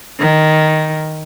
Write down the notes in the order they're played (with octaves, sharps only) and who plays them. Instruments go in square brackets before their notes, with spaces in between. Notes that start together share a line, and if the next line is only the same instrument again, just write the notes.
[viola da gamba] D#3